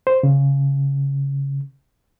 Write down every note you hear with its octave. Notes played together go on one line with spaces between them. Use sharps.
C5
C#3